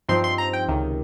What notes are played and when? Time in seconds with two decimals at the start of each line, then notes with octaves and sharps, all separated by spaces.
0.09 G2 F3 C4 D#4 C6
0.24 C6
0.38 A#5
0.53 G5
0.68 C#2 C3 D#3